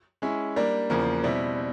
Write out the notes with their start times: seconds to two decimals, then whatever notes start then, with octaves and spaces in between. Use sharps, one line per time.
0.22 G#3 C#4 E4
0.56 G3 A#3 D4
0.90 E2 C#3 F3 A#3
1.24 B2 G3 C4 E4